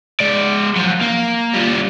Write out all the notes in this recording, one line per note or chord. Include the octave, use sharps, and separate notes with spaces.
G#3 D5
F3 F#3
A#3
G3 F4